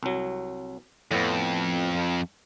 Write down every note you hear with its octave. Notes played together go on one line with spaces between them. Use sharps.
C2 F#3
F2 A2 B3